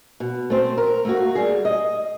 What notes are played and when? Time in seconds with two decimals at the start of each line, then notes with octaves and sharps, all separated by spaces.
0.20 B2
0.50 A3 C4 C5
0.78 A#4
1.05 A3 A#3 F#4
1.35 G3 G#4
1.65 D#5